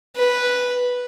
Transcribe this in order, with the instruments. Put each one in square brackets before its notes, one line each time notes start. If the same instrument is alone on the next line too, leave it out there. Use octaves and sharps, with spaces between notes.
[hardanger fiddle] B4